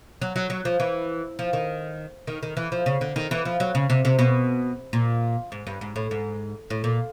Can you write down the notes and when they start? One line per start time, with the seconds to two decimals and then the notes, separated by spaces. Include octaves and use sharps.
0.22 F#3
0.36 F#3
0.50 F#3
0.65 F3
0.80 E3
1.39 F3
1.53 D#3
2.27 D#3
2.43 D#3
2.57 E3
2.72 F3
2.86 C#3
3.01 D3
3.16 D#3
3.31 E3
3.45 F3
3.60 F#3
3.75 C#3
3.90 C3
4.05 C3
4.19 B2
4.93 A#2
5.52 G#2
5.67 G2
5.81 G#2
5.96 A2
6.11 G#2
6.70 A2
6.84 A#2